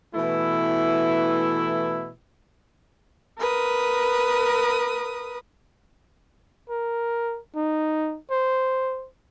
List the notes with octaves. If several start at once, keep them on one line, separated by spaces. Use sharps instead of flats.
B2 E3 A3 E4
A#4 B4 D#6
A#4
D#4
C5